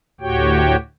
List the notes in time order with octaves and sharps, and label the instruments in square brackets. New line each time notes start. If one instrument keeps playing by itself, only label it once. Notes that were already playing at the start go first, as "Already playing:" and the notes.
[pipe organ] D2 A2 F#4 G4 C#5 G5